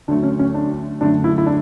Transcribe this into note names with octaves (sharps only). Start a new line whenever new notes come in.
D2 D3 F#3 A3 D4
C#4
C#4
D4
F#2 D3 A3 D4
E4
E4
D4